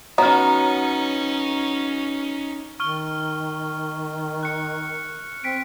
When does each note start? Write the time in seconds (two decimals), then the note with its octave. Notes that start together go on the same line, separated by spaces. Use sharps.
0.18 F#3 B3 C#4 D#4 F#4 A#5 F6
2.80 D#3 C#6 F6 G7
4.43 F#6 C#7
5.44 C4 B6 D7